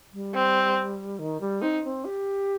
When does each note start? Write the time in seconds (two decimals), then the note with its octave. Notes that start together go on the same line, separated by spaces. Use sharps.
0.13 G3
0.35 C4
1.19 D#3
1.41 G3
1.62 C4 D#4
1.84 C4
2.05 G4